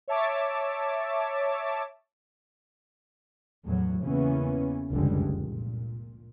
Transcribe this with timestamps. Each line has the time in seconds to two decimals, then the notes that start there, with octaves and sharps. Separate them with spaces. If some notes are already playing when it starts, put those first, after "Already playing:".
0.08 C#5 E5 A5 D6
3.66 E2 A2 F#3
4.03 E2 C#3 E3 A#3 B3 C#4
4.92 F1 C#2 F#2 D3 G3 G#3
5.33 A#2